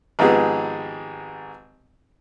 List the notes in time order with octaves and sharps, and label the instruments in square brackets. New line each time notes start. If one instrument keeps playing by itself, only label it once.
[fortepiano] G#1 G#2 F3 B3 G4 G#4